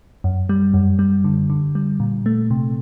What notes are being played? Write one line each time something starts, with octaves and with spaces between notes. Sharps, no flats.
F#2
G3
F#2
G3
D3
D3
G3
A#2
A3
C3